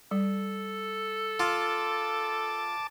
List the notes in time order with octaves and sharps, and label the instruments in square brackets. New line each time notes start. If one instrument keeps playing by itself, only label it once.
[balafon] G3 [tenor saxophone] A4
[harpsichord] F4 [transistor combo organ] A5 D6